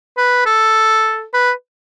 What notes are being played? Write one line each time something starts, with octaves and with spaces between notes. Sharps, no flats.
B4
A4
B4